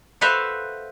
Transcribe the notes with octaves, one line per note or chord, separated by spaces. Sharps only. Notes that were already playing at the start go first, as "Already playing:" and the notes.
F#4 A4 B4 C5 E5 F5